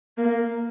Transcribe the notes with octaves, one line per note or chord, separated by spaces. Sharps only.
A#3